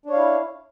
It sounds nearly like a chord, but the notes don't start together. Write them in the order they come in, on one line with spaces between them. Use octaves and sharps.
D4 C#5 F5 E4